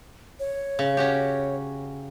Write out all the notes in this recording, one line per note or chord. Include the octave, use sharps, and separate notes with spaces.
C#5
C#3
C#4 F#4 G4